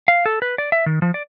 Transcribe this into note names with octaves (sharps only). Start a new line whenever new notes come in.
F5
A4
B4
D5
E5
D#3
F3
D5